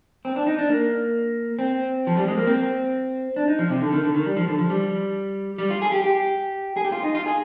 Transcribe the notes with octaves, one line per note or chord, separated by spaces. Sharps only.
C4
D4
D#4
D4
A#3
C4
F3
G3
G#3
A#3
C4
D4
D#4
F3
C3
D3
D#3
D3
D#3
G3
F3
D3
F3
G3
G3
F4
G#4
G4
G4
G#4
G4
F4
D#4
F4
G#4